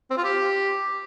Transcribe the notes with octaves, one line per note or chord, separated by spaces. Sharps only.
C4
F4
G4